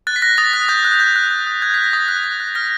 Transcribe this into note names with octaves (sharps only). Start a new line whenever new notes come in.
F#6 A6
B6
F#6 A#6
D#6 A6
F#6
D#6 G6
F#6
F#6 G6
F#6
F#6
D#6
F#6 G#6
F#6 B6
A#6
D#6 A6
F#6
F#6
F#6
F6 A#6